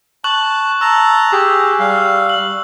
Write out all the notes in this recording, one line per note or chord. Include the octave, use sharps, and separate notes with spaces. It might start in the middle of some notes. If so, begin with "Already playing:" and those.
A5 C#6 F#6 F#7
A5 A#5 E6
G4 G#4
G3 F5
F#7